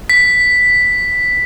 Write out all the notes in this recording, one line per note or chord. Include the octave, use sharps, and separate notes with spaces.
B6